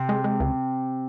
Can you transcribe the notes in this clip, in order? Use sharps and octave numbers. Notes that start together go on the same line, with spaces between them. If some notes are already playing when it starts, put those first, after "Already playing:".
Already playing: C3
G#3
G#3
C#2